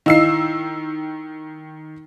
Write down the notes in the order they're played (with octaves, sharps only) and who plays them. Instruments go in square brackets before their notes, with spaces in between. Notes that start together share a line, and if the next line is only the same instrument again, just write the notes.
[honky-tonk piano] D#3 E6 C7 [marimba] E4 D#5 F5